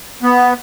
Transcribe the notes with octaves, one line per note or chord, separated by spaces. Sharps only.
B3